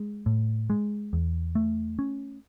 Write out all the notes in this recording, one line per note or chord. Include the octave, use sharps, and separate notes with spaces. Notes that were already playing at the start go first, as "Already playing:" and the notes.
Already playing: G#3
A2
G#3
E2
A3
C#4